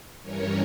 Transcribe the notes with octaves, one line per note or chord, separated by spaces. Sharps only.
G2 E3 G3 C#4 A#4 C#5